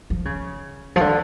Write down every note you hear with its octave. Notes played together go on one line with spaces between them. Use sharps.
F3
C#3
F3
D3